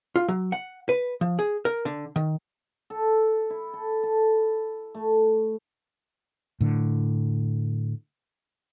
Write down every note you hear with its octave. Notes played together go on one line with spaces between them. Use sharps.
F4
F#3
F#5
B4
F3
G#4
A#4
D3
D#3
A4
E4
A4
A4
A3
A2 D3